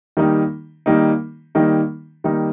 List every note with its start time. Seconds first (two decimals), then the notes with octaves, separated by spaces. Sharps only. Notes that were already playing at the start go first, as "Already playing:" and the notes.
0.17 D#3 G3 A#3 D#4
0.86 D#3 G3 A#3 D#4
1.55 D#3 G3 A#3 D#4
2.24 D#3 G3 A#3 D#4